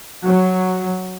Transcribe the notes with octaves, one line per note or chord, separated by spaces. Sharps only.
F#3